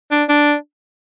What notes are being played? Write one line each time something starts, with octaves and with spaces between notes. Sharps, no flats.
D4
D4